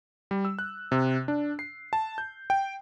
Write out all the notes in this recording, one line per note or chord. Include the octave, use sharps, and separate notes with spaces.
G3
E6
F#6
C3
D4
C7
A5
G6
G5